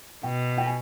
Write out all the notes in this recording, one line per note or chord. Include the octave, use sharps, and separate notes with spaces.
B2 G5
G5
G#5